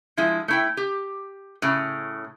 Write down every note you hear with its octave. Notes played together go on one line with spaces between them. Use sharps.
F3 G#3 E4
A3 E4 G5
G4
A2 C#3